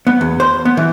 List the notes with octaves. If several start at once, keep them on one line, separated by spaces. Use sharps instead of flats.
B3
E2
C5
B3
E3